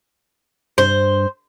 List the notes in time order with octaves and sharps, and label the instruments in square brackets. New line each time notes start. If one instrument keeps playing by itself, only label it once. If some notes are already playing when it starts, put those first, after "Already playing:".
[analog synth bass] G2 [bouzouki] C5